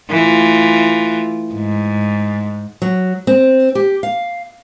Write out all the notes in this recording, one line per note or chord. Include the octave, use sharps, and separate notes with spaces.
E3 A3 F4
G#2
F#3
C4
G4
F5